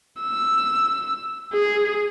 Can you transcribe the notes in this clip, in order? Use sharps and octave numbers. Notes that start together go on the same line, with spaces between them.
E6
G#4